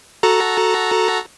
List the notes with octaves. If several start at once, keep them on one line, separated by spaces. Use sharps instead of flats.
F#4 A4 A#5